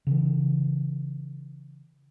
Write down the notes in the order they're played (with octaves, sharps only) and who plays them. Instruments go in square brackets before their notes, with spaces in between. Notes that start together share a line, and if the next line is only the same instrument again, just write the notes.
[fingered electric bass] C#3 E3